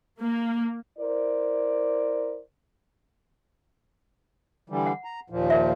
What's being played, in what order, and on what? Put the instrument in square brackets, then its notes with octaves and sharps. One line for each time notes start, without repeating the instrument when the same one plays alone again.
[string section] A#3
[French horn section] E4 A#4 C5 D5
[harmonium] D3 E3 G3
[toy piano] F#5
[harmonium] A#5
D#2 A#2 F3
[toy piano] A#4 E5